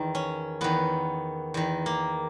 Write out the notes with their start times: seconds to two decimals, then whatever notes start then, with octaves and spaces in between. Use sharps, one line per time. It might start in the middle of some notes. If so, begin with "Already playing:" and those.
Already playing: E2 D#3
0.15 C#4
0.61 E2 D#3 B3
1.54 E2 D#3
1.86 A#3